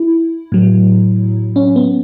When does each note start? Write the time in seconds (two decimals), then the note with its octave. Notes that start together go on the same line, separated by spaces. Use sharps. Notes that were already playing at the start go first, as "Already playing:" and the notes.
Already playing: E4
0.52 A2 F#3
1.56 C#4
1.76 B3